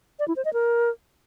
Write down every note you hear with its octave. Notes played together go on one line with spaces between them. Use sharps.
D5
E4
C5
D#5
A#4